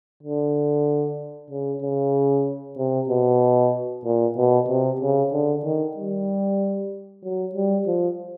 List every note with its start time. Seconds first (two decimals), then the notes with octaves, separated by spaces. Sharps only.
0.23 D3
1.51 C#3
1.83 C#3
2.78 C3
3.09 B2
4.05 A#2
4.37 B2
4.68 C3
5.01 C#3
5.33 D3
5.64 D#3
5.97 G3
7.24 F#3
7.55 G3
7.87 F3